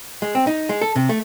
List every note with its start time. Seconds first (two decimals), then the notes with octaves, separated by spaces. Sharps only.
0.22 G#3
0.35 C4
0.47 D#4
0.69 G#3
0.81 A4
0.96 C3
1.09 A3